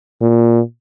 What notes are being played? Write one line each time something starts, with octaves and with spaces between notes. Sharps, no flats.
A#2